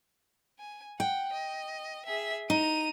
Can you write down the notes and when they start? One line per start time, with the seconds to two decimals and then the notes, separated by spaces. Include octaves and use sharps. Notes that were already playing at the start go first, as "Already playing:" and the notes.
0.59 G#5
1.00 F#5 G5
1.33 D#5
2.06 G#4 E5
2.50 D#4 A#5 D#7